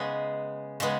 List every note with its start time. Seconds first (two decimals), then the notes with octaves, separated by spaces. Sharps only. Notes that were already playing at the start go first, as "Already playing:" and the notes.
Already playing: C#3 G#3 B3
0.80 C#3 G#3 B3